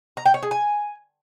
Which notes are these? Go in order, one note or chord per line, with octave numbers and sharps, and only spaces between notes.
A#5
G5
C#5
G#4
G#5